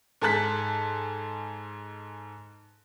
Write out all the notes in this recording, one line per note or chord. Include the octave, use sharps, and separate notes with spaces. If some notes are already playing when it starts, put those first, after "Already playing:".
G#2 G#4 A4 A5 F#6 B6